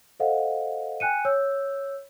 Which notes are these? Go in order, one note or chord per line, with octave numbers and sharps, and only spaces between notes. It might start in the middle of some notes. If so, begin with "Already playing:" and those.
A4 C5 D#5 F5 F#5
G5 G#5 F#6 C#7 D#7
C#5 E6 G6